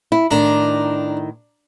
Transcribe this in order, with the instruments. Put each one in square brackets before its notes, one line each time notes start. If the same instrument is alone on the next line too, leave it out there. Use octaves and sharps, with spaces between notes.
[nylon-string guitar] E4
[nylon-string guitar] A2 D#3 [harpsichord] D4 A#5